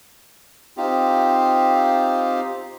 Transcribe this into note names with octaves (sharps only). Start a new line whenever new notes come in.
C4 D#4 F4 G4